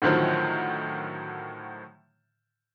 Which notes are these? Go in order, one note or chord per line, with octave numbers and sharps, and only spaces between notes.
A2 D3 D#3 F3 F#3